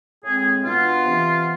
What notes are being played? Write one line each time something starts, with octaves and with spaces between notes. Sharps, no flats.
A2 G#3 C4 G#4
B2 B3 D4 F4
C3 E3 B3